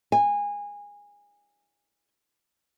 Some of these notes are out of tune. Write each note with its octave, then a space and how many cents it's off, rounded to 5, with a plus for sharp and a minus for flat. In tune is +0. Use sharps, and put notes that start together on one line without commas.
G#5 -20